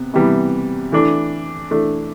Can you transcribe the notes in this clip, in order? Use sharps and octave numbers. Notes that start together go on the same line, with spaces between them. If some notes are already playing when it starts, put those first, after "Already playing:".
Already playing: C3 B3
C3 E3 G3 B3
E3 A3 D4
E3 A3 D4